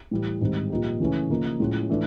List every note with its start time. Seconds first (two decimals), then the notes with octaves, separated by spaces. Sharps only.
0.11 A2 E3 G3
0.41 G#2 D#3 G3 C4
0.70 A#2 F3 A#3 D#4 G4
1.00 C#3 E3 A3 C#4
1.30 C#3 F3 A#3 D#4
1.60 A2 F3 G#3 C#4 F4
1.90 E3 A3 D4